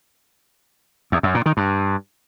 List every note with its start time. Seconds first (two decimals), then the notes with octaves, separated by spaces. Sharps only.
1.12 E2
1.23 F#2
1.34 A#2
1.46 D#3
1.57 G2